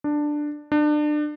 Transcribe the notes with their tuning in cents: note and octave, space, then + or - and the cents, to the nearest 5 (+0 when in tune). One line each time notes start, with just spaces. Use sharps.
D4 +10
D4 +30